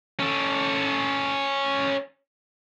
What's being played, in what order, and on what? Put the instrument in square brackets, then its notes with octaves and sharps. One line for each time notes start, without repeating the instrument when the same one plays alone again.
[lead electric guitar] C#4 A4